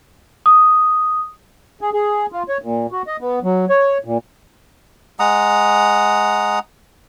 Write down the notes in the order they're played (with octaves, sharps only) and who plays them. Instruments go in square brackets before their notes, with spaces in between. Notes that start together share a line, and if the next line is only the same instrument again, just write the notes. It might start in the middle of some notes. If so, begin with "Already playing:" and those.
[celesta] D#6
[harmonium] G#4
G#4
F4
C#5
A#2
F#4
D#5
B3
F#3
C#5
A#2
[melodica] G#3 F#5 A#5 D#6